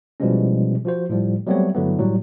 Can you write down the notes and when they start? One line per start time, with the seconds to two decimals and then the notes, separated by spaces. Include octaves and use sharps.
0.20 B2 E3 F3 G3 G#3 C#4
0.85 F3 F#4 C5
1.09 A2 F3 G3
1.47 F#3 G3 A3 B3 C4 C#5
1.75 G2 D3 E3 F#3 A3 B3
1.99 A2 F#3 G3